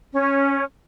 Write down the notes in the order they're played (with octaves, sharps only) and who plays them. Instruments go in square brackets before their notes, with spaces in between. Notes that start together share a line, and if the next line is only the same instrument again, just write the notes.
[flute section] C#4